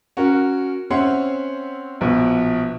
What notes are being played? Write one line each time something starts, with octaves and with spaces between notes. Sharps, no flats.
C#4 F#4 A#4
C4 C#4 C#5 E5 F#5 C6
A#1 B2